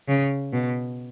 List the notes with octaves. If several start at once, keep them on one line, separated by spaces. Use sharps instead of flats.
C#3
B2